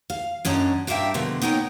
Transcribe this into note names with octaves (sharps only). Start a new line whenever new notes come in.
F5
F#2 C#4 D4 D#5 A#5
G2 D4 A#4 E5 F5 G5
B2 D3 F3 A#4
B3 D#4 A#4 C#5 G5